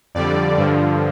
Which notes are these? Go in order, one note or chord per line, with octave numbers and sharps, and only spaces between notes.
F2 D3 G3 D5
G2 D3 F3